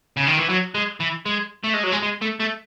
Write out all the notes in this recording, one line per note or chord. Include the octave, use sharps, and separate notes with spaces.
C#3
D#3
E3
F#3
G#3
E3
G#3
A3
G#3
F#3
G#3
G#3
A3
A3